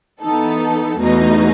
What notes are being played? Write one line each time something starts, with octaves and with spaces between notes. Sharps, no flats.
E3 B3 D#4 A4
E2 B2 A3 D#4